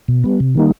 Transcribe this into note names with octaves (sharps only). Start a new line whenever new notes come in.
B2
G3 B3
C3
D#3 G3 A#3 D#4